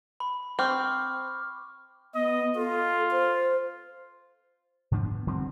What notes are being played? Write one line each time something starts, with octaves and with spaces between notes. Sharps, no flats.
B5
C4 C#6 D6 F6
B3 D#5
F4 A4
C5
G#2 D3 F3 D4
B3
D3 G3 C4